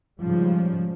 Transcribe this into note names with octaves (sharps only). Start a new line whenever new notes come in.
G#2 C#3 F3 G3